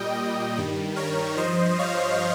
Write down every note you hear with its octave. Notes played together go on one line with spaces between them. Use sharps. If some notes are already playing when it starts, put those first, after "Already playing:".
Already playing: A#2 G3 D#5 G5
D#5 G5
G2 D#3 G3
A#4 C#5
G2 F3 C5 D#5
C#5 F5